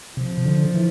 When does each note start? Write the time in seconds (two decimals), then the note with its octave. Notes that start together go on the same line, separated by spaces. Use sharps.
0.17 C3 F3
0.46 D3
0.74 E3